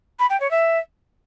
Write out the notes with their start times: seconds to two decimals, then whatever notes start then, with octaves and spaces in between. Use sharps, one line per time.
0.19 B5
0.30 G5
0.40 C#5
0.51 E5